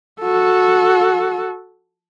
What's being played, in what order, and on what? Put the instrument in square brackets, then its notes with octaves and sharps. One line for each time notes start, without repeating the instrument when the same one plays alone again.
[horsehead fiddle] F#4 A4